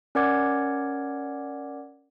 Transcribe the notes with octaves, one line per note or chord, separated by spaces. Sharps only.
C#4 A#4 D5 F#5 D6 G#6